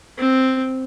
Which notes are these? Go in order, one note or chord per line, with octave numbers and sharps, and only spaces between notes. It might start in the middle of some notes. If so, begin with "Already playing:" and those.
C4